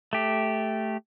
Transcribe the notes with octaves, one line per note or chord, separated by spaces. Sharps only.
A3 G4